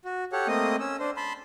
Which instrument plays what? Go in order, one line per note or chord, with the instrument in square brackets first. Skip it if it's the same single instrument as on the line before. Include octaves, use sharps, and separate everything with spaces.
[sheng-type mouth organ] F#4
G4 A4 C#5 F#5
A3 A#3 C4 D#5 D#6
C#4 E6
D4 C5
A5 B5 C6